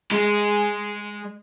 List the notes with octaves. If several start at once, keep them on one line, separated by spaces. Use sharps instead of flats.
G#3